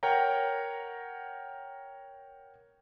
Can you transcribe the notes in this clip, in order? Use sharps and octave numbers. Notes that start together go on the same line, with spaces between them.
A#4 C#5 F#5 G5 A#5